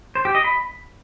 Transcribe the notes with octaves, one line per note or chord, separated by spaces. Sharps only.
C5
G4
D#5
B5